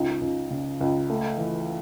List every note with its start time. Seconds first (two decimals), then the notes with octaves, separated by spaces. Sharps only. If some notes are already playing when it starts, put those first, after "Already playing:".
Already playing: C#2 D#4
0.21 C#2
0.51 C#3
0.81 C#2
1.10 A3
1.38 E3